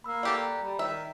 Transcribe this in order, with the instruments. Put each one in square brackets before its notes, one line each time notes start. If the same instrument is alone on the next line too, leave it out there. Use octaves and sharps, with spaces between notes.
[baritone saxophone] A#3 [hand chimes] B5 E6
[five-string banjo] F#4 G4 A4 [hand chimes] D5 A#5
[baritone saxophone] G3
[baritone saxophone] D#3 [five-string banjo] E5